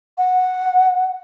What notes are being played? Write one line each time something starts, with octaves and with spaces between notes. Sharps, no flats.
F#5